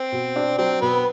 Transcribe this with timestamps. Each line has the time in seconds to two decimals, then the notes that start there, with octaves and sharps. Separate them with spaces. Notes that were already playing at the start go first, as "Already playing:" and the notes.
Already playing: C4
0.12 B2
0.36 D4
0.58 F#3 C4
0.82 B2 B3